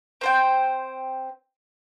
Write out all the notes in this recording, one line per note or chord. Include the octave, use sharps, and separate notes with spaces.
C4 C5 G5